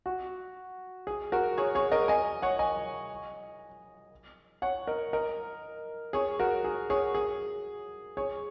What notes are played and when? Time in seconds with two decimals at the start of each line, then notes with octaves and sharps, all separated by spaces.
0.06 F#4
1.07 G#4
1.32 F#4 A#4
1.58 G#4 C#5
1.75 G#4 C#5
1.92 A#4 D#5
2.08 D#5 G#5
2.42 C#5 F#5
2.59 D#5 G#5
4.62 C#5 F#5
4.87 A#4 D#5
5.13 A#4 D#5
6.13 G#4 C#5
6.39 F#4 A#4
6.64 G#4
6.90 G#4 C#5
7.15 G#4
8.17 G#4 C#5